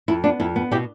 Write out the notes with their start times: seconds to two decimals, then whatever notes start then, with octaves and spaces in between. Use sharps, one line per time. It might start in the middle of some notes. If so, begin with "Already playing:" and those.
0.08 F2 E4
0.24 B3 D4
0.40 F2 E4
0.56 B3
0.71 B2 E4 G4